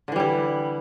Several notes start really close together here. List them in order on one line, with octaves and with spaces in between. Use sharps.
D3 E3 G3 E4